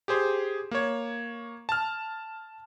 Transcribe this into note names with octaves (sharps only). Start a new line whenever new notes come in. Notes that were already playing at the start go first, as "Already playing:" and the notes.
G4 G#4 C5
A#3 C#5
A5 F6